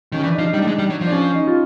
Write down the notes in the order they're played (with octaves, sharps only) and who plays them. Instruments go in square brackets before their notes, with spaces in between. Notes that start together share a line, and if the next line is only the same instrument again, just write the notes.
[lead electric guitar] D#3 [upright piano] C#4
[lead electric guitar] E3 [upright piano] D4
[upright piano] D#4
[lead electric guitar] F3
[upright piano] D#4
[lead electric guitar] G3
[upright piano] D4
[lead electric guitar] A3
[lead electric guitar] G#3 [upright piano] D4
[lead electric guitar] G3
F#3
F3
[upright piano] D4
C#4
D#4
F4